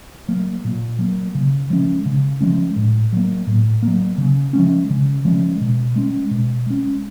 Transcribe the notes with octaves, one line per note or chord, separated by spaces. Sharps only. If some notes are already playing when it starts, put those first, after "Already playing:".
F#3 A#3
A#2
F#3 A#3
C#3
F3 G#3 C#4
C#3
F3 G#3 C#4
A2
F#3 A#3
A2
F#3 A#3
C#3
F3 G#3 C#4
C#3
F3 G#3 C#4
B2
G#3 C#4
B2
G#3 C#4